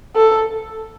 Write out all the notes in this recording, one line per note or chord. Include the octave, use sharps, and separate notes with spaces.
A4